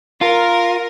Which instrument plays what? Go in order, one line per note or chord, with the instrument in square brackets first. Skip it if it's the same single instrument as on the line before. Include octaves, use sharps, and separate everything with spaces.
[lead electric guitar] F4 [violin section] A#4